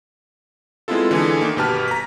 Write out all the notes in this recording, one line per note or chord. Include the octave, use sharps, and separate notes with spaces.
G#3 B3 C4 E4 F4 A4
D3 E3 G#4
D#3 A#3
G1 B2 G4 B4 A5 F6
A#5 B6